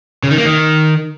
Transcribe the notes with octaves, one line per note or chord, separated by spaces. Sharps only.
C#3
D#3
A#3
D#3